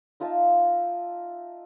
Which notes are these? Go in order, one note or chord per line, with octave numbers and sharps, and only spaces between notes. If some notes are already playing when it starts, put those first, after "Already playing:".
D#4 F4 E5 A5